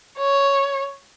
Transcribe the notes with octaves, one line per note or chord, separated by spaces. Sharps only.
C#5